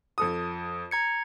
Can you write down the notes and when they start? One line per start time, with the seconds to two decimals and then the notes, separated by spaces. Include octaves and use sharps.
0.18 F2 A4 D#6
0.91 A#5 G#6 C#7